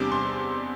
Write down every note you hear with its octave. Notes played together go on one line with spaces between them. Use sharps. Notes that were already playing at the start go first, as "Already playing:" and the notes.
Already playing: E2 C3 G3 D4 D6
C6